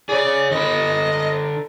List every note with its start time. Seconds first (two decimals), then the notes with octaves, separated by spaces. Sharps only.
0.09 G#4 C#5 D5
0.51 D3 B4 D#5